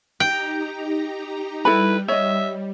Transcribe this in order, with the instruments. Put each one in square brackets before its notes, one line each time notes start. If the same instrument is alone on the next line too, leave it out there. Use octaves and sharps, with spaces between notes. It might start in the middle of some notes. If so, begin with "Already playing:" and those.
[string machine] D#4 G4 A#5 [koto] G5
[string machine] G3 [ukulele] E4 A4 B5 [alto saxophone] B4
[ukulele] C#5 D#5 [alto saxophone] E5